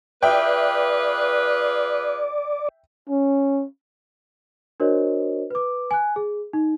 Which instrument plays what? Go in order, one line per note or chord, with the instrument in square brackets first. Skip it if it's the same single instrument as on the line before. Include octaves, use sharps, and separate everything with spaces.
[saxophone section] F4 G#4 B4 [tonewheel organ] D5 [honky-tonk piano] E5 G5
[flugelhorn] C#4
[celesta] D4 F#4 A#4 C5 C#5 D#5
B4 D6
G#5 F#6
G#4
D#4